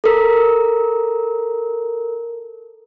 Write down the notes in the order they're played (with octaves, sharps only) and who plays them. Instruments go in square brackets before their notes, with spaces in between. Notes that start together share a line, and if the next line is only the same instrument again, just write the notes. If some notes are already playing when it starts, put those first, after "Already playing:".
[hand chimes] A4 A#4